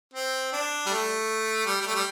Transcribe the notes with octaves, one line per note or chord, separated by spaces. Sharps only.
C4
D4
G3
A3
G3
G3
A3
G3